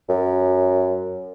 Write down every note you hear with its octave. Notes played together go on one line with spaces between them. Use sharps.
F#2